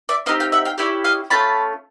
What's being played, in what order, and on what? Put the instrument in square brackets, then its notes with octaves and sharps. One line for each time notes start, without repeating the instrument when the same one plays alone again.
[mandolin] D5 E5
C4 D#4 G4 D#5 F5
F5 G5
E5 F#5
F5 G5
C#4 E4 G4 D5 E5
D#5 F5
A3 C#4 F4 A5 B5